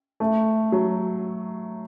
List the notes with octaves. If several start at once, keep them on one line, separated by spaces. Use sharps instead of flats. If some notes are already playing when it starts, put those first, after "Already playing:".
A3
F#3